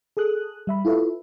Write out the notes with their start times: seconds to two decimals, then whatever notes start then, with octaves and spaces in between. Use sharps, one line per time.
0.17 G#4 A4 D#6 F#6
0.67 G3 E5 B5
0.85 E4 F4 A4 B4 E5